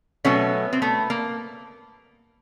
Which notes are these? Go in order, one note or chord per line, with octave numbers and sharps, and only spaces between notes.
B2 F#3 A3 B3 C#4
C4
A3 B3
A#3